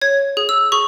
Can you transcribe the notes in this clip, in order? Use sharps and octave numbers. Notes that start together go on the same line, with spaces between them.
C#5 G#6
G#4
E6
G#4 C#6